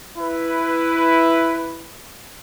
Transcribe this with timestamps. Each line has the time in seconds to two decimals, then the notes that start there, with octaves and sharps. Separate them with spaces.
0.18 E4 B4